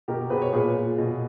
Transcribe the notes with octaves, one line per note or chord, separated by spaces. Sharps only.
B2 G4 A#4
B2 G#4 B4
C#5
A#2 G#4 B4
A#2
B2